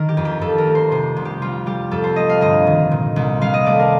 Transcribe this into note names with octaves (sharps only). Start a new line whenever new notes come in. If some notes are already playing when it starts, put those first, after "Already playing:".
Already playing: D#3 A#4
G4
F2
G4
F2 A4
A#4
A3
C5
C3 C5
C2
G4
C2 F4
G3 G4
F2 A4
C5
A3 D#5
F5
G1 D#5
D#3
A#2
C2
C2 F5
D#5
A3 D5
A#4